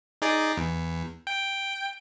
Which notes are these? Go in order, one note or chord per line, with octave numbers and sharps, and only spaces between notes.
D#4 G#4 D5
E2
G5